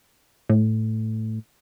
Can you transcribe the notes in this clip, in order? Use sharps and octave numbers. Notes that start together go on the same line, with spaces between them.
A2